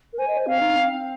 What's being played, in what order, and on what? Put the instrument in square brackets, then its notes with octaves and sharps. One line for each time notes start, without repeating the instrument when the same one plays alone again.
[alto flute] A#4
[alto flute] C5 [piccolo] G#5
[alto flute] D#5
C5
[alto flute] C4 [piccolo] F5
[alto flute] D#4
C4